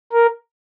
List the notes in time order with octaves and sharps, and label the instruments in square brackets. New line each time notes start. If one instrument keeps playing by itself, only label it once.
[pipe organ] A#4